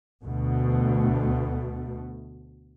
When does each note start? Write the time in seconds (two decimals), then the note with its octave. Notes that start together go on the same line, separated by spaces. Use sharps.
0.24 D2 B2 A3